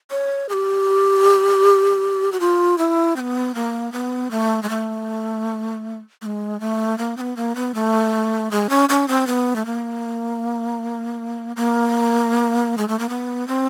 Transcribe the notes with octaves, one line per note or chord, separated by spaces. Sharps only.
C#5
G#4
G4
F#4
F4
E4
C4
B3
A#3
B3
A3
G#3
A3
A3
G#3
A3
A#3
C4
B3
A#3
B3
A3
G#3
C#4
C#4
C4
B3
A3
A#3
A#3
G#3
A3
A#3
B3
C4